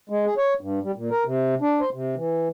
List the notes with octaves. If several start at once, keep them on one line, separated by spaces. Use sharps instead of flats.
G#3
G#4
C#5
G2
G3
A#2
A#4
C3
D4
C5
C3
E3